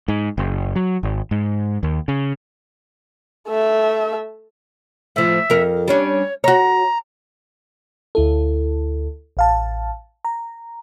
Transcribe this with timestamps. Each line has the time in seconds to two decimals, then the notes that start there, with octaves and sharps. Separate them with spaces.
0.08 G#2
0.38 F#1
0.76 F#3
1.03 G#1
1.31 G#2
1.83 D#2
2.08 C#3
3.48 A3 E5
5.16 A2 F3 E5
5.50 F2 A#4
5.88 G3 C#4 D4 C#5
6.44 F#4 C#5 A#5
8.15 D2 E4 A4
9.37 A1 F5 A5
10.25 A#5